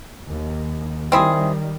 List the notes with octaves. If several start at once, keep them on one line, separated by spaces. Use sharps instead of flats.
D#2
D#3 G3 C4 E4 G#4